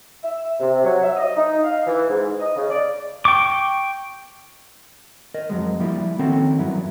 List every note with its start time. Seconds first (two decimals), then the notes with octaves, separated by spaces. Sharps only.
0.23 E5
0.60 C3
0.84 F#3
1.04 E5
1.17 D#5
1.37 D#4
1.64 F5
1.87 E3
2.08 G#2
2.40 D#5
2.56 C#3
2.70 D5
3.25 G5 C#6 D6
5.34 A#4 D#5
5.50 F2 F#3 G#3
5.80 F3 G3 A#3 E4
6.19 D#3 C4 C#4 F#4 A4 A#4
6.59 E2 G2 F#3 E4